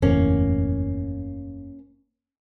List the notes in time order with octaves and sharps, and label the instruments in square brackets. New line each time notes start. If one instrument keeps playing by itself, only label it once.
[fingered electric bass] F#1 E2 A2 [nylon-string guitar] A#3 C#4